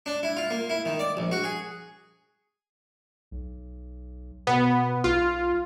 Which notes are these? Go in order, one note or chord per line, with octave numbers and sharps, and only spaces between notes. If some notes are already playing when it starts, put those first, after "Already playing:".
D4
E4
F4
A#3
E4
D#3
D5
A#1
F#4
G#4
B1
B2 B3
B1 F4